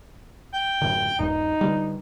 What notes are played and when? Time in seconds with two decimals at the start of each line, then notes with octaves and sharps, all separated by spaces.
0.53 G5
0.82 F#2 A2 D3
1.19 D#1 G2 D#4
1.61 D3 G3